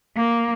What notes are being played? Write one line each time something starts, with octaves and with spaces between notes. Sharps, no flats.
A#3